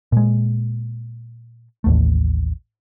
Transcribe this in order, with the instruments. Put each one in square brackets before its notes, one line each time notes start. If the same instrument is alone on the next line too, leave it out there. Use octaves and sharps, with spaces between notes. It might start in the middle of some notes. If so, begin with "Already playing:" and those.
[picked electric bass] A#2 G#3
A1 D#2 A3